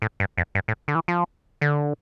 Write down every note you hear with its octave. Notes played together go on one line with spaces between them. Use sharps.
A2
G2
F2
G2
A2
D3
E3
F3
D3